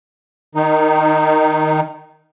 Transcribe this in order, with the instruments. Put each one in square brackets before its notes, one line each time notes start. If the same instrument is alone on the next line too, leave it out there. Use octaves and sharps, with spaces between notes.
[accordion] D#3 D#4